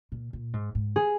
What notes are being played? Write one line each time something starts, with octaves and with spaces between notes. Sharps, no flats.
A#2
A#2
G#2
G#2
G#4